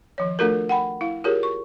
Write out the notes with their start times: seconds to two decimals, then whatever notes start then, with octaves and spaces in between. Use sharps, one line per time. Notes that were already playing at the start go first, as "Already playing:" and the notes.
0.18 D#3 F3 C#5
0.39 A3 D4 F4 F#4 A4 A#4
0.69 F#5 G5 B5
1.01 E4 F5
1.24 F4 G4 G#4 A#4 C#5
1.43 C#6